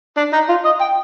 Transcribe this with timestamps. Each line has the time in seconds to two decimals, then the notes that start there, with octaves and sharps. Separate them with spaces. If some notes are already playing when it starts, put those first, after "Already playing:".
0.17 D4
0.33 D#4
0.49 F4
0.65 D#5
0.81 G5